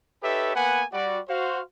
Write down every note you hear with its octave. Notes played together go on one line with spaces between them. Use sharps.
D#4 G4 A4 B4 C#5 E5
A#3 B3 B4 F#5 G#5
G3 F#4 D5
F#4 C5 F5